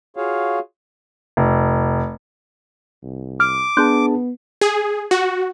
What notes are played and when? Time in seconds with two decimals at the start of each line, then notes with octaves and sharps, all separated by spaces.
0.17 F4 F#4 G#4 C#5 F5
1.37 F1
3.02 C2
3.40 D6 F6
3.77 B3 D4 G#4 A5 C6 F#6 G6
4.61 G#4
5.11 F#4